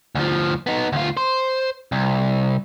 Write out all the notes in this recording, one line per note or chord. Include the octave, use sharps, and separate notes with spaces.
D2 F3
B3 D#4
D2 F4
C5
C2